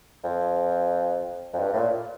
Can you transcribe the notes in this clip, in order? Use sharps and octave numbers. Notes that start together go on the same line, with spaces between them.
F2
F2
G2
A2
A#2